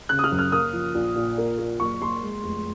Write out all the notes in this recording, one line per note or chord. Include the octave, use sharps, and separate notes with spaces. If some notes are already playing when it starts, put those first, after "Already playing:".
C#3 F#6
D#6
F6
F#2
F6
A#3 D#6
F3
A#1
A#2
A#3
A#3
F#1 C#6
F#1 C6
G#3
F1